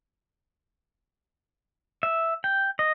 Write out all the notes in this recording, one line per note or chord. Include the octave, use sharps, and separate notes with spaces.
E5
G5
D#5